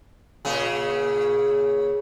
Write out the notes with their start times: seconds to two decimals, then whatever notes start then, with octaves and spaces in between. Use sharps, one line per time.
0.45 A#2 C#3 G#4